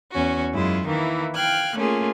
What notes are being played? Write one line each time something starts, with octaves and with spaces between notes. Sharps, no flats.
E2 C#4 F#4
F#2 G#3 E4 F4
D#3 E3 A#3 E4
F5 G5 F6 F#6 G#6
A3 A#3 C#4 F4 G#4